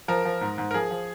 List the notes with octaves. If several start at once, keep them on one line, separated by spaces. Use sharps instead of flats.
F3 A#4
F3
G#2
G#2
A#4
F3 G#4
F3